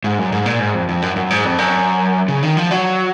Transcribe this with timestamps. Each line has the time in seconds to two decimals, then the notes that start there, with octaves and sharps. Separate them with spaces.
0.04 G#2
0.18 F#2
0.32 G#2
0.46 A#2
0.60 G#2
0.74 F2
0.89 F2
1.02 F#2
1.16 F#2
1.30 G#2
1.45 F2
1.58 F#2
2.28 C#3
2.43 D#3
2.57 F3
2.71 F#3